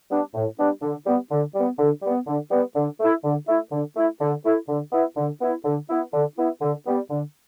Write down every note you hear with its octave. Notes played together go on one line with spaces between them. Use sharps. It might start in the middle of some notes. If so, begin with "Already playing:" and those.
G3 B3 D4
A2
G3 B3 D4
D3
G3 B3
D3
G3 B3
D3
G3 B3
D3
G3 B3
D3
A3 E4
D3
A3 E4
D3
A3 E4
D3
A3 E4
D3
B3 E4
D3
B3 E4
D3
B3 E4
D3
B3 E4
D3
G3 B3
D3